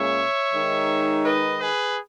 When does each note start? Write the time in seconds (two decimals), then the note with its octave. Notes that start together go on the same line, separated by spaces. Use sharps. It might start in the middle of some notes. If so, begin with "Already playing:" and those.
Already playing: A#2 G#3 C#4 C#5 E5
0.54 D#3 G#3 D#4
1.24 B4 D#5
1.59 G#4 B4